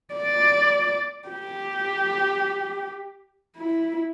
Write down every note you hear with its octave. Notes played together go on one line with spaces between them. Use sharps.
D5
G4
E4